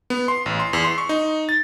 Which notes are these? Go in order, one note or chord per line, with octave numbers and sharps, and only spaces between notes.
B3
C6
A1
C6
E2
C6
C#6
D#4
A6